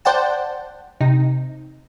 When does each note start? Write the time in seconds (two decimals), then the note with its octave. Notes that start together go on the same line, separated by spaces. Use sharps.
0.05 C5 D5 F#5 G5 A5
1.01 C3 D#4